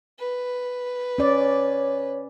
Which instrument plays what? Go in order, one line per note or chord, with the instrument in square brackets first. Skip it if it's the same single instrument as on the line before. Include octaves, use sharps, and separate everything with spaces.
[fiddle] B4
[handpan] C#4 D5 [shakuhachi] C#5